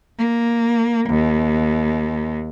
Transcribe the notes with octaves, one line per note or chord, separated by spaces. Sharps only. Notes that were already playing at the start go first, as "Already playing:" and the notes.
A#3
D#2